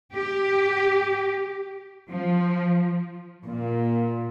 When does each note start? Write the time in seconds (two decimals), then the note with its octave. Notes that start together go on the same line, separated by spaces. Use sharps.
0.14 G4
2.10 F3
3.45 A#2